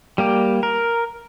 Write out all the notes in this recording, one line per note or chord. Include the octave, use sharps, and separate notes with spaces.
G3 A#3 G4
A#4